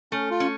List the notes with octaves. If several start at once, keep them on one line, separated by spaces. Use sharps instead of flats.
A3 C#4
F4
C#4